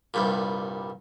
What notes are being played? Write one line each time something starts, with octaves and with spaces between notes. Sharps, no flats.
C2 G2 A#2